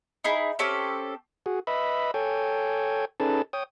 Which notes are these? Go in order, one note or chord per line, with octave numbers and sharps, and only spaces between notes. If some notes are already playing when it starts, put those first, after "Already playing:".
D#4 E4 G#4
C4 C#4 G4 A4
F#4 G#4
B4 D#5 E5 B5
A4 C#5 G5 G#5
C#4 D#4 G#4 A4 B4 A5
C#5 G5 D#6